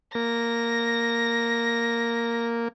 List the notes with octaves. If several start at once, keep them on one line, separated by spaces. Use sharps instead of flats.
A#3 A#6